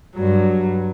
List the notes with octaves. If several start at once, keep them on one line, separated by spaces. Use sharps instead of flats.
G2 F#3